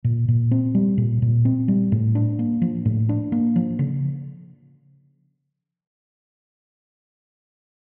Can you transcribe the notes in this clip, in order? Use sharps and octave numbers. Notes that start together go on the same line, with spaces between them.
A#2
A#2
C4
G3
A#2
A#2
C4
G3
A2
D4
A#3
F3
A2
D4
A#3
F3
C#3